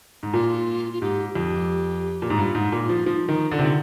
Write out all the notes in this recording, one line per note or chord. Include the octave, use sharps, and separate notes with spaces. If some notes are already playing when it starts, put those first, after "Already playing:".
G#2
A#2 F4
F4
G#2 G4
F2
G4
A#2
G#2
G2 F4
G#2
D#4
A#2
F4
F3
F3 D#4
D#3 D#4
D3 F4
C3
D3